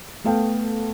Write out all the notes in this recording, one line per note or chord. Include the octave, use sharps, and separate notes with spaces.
A3 B3 A4 F5 G5 A5